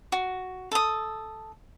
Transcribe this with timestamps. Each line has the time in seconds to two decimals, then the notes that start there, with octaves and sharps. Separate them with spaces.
0.12 F#4
0.72 A4 D#6